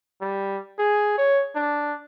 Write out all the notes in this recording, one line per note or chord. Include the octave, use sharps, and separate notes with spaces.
G3
G#4
C#5
D4